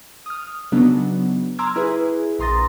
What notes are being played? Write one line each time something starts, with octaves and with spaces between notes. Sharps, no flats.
D#6 F6
C#3 F#3 B3 D4 D#4
A#5 C6 D6 E6 F6 G#6
E4 G#4 B4
A#1 A#5 C6 D#6 A6 A#6